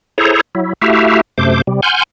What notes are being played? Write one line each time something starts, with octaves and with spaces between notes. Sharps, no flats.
E4 G#4 A4 C5 C#5 A#5
F#3 E4
A3 E4 F#4 G4 E5 F5
F#2 C3 A3 C5 D6
C3 G3
F#5 G#5 C6 F6 G6